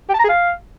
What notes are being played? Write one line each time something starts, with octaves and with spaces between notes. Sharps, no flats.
G4
A5
A#5
G#4
F5